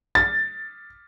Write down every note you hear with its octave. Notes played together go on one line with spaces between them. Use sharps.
A6